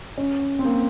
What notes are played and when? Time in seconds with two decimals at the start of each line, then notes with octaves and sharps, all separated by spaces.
0.18 C#4
0.59 C4
0.65 A#3